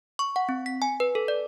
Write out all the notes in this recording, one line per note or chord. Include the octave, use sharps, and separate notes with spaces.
C#6
F#5
C4
B6
G#5
B4
A4
D5